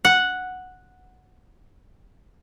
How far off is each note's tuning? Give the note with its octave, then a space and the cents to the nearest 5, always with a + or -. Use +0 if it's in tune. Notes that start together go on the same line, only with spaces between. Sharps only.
F#5 -5